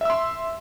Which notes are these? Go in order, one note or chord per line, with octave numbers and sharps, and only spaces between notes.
E5 C6 E6